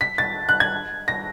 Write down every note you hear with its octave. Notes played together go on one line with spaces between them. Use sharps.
B6
A6
F#6
G#6
A#6